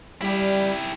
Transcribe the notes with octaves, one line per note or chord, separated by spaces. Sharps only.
G3 E4 G4